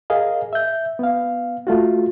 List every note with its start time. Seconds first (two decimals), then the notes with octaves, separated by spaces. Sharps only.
0.10 G#4 A#4 D#5 F5
0.53 E5 G6
0.99 B3 F5
1.67 A3 F4 F#4